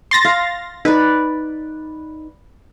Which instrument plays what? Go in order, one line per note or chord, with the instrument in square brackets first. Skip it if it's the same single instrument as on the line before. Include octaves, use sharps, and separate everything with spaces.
[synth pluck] C6 A6 A#6
[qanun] F5
[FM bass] D#4 [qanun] B4 D5